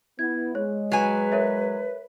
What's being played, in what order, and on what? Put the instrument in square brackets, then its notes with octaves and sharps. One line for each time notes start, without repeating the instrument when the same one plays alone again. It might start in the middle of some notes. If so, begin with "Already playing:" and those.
[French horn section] B3 E4 [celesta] G#6
[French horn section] G#3 [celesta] C#5
[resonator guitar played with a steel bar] F#3 G#5 [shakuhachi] B4
[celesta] A#4 C#5 E5